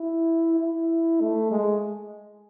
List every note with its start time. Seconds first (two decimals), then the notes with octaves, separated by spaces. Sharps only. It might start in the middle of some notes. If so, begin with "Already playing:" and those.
Already playing: E4
0.59 E4
1.20 A3
1.51 G#3